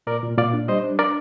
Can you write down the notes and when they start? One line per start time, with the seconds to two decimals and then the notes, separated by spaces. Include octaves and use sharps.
0.07 A#2 A#4 D5
0.23 A#2
0.38 A#2 D5 F5
0.53 D4
0.68 G3 C5 D#5
0.84 D4
0.99 D4 A#4 D5